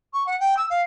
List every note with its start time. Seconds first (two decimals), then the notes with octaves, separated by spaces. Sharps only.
0.13 C#6
0.26 F#5
0.40 G5
0.57 E6
0.70 F5